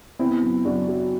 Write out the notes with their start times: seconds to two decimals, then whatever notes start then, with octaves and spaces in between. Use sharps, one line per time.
0.19 B3 C4 E4
0.42 F#2
0.65 F#2 D4 F#4
0.88 F#3